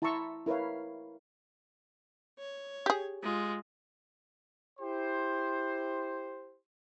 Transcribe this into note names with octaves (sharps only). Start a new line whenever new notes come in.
E4 A5 A#5 C6 C#6 E6
E4 A#4 B4 C#5 F5
C#5
G4 G#4
G#3 F4
E4 G4 C5